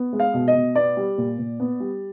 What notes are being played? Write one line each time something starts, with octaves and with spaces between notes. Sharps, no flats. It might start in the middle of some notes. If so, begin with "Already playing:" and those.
Already playing: B3
G#3
F5
B2
D#5
B2
B3 D5
G3
A#2
A#2
B3
G3